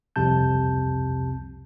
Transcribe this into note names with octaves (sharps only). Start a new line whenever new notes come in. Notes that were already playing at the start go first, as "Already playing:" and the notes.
C2 F2 C3 A5 G6